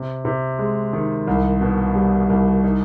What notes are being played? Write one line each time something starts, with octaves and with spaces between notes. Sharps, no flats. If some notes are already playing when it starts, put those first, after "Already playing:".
Already playing: C3
C3
G#3
D#3
C2
B2
G3
C2
D#4